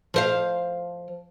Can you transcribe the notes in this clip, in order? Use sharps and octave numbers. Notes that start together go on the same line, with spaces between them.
F3 C5 F5